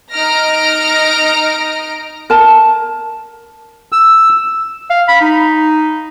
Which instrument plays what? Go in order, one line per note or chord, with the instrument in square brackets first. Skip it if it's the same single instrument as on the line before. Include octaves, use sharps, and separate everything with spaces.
[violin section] D#4 D#5 A#5 F6 A#6 D7
[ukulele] A#4 A5
[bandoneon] E6
[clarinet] F5
B5
D#4